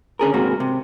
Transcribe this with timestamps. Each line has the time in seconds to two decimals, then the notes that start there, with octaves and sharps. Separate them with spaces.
0.19 D3 C#4 G#4 A#4
0.34 G#2 C3 A#3 F#4
0.60 C3